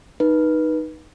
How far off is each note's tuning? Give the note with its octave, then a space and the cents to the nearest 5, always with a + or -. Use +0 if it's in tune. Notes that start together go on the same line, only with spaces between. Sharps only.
D#4 -5 B4 -20